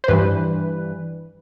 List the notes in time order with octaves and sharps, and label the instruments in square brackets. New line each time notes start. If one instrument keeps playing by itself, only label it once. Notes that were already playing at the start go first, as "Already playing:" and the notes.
[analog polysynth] C5
G2 E3 G3 B4